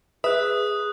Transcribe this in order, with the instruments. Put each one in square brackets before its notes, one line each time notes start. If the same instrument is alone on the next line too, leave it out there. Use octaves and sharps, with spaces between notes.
[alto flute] G#4 [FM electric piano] B4 [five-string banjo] E5 [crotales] D#6 F#6